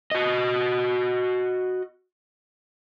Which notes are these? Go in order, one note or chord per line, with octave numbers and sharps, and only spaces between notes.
F#4 D#5